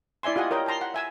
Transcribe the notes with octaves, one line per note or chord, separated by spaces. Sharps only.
E4 D5 E5 G#5 C6
F4 G4 D#5 F#5 G#5 D#6
A#4 C#5 D#5 G5
G5 A5 A#5 C6
F#5
E5 G#5 E6